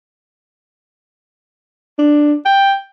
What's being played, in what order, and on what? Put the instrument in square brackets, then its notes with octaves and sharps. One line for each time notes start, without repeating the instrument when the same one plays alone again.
[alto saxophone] D4
G5